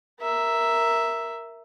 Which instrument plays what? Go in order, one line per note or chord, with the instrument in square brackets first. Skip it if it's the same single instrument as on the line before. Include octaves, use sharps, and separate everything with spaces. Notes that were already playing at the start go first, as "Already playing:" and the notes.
[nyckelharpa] A#4 E5